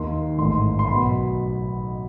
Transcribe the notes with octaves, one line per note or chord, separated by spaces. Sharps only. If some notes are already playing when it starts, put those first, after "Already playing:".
Already playing: D#2 D#3 C6
A1 G#2 D#3 C6
C6
B1 B2 B5